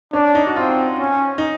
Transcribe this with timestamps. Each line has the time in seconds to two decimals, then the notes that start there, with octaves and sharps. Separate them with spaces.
0.13 C#4 D4
0.35 D#4
0.47 F#4
0.56 C4 F4
0.99 C#4
1.38 D#4